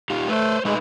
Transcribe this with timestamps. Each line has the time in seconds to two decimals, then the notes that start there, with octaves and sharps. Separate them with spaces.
0.10 D#4 F4 G4
0.28 A3 B4 C5
0.65 G#3 A3 D#4 B4